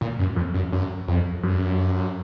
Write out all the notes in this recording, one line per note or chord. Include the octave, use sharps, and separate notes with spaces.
A#2
F#2
F2
F#2
F#2
F2
F#2